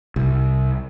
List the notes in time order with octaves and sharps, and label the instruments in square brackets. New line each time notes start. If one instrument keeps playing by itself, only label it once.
[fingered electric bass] C2